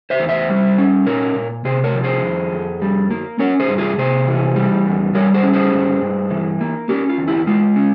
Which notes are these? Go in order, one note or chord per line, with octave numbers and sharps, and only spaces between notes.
C5 E5
E2
C5 E5
G3
C#4
A#2 A#4 C#5
A#2
C3 G#4 C5
A#4 C#5
F3
G#4 C5
F2
F2
G3
A#3
C#4 A#4 C#5
G#4 C5
G2
F4 G#4
C3 G#4 C5
E3
G3
E2
G3 A#4 C#5
G#4 C5
C#4
G#4 C5
G2
G2
E3
A#3
C#4 G4 A#4
F4
E2
E4 G4
G#3 F4
C#4